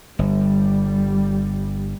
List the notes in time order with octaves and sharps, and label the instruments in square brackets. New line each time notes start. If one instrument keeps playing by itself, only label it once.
[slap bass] G1 [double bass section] G3